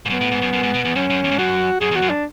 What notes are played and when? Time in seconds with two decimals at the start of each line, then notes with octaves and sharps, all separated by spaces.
0.05 G#2
0.10 F#2 B3
0.21 A2
0.31 G#2
0.42 F#2
0.53 F#2
0.63 G#2
0.74 B2
0.85 E2
0.95 F#2 C#4
1.10 F#2
1.24 E2
1.31 G#2
1.38 F#2 F#4
1.80 F#2 G#4
1.91 E2
1.95 F#4
2.02 F#2
2.10 D4